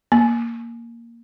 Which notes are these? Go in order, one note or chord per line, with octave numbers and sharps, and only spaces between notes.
A#3